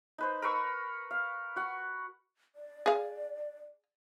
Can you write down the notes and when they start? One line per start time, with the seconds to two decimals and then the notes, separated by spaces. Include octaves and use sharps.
0.18 D#4 B4 C5
0.42 A#4 B4 C#6 E6
1.11 F5
1.56 F#4 F#5
2.56 D5
2.86 G#4 F5